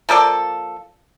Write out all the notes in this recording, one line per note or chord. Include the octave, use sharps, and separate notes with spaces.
F3 A#3 A4 D5